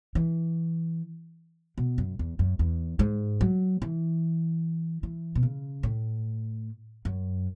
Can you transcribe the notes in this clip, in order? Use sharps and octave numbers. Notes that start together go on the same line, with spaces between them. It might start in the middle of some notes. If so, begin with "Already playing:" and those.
E3
B2
F#2
E2
F#2
E2
G#2
F#3
E3
E3
B2
C#3
A2
F#2